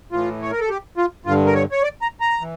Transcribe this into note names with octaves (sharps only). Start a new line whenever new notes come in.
A2 E3 F4
C#5
A#4
A4
G4
F4
G2 D3 F4
A#4
C#5
C#5
D5
A#5
A#5
E3